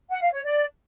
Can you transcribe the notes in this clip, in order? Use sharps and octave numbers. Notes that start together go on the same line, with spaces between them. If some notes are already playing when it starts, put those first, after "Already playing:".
F#5
F5
C#5
D5